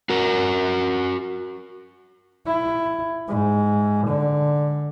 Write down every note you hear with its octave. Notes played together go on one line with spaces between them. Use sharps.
F#4 A#4
E4
G#2
D3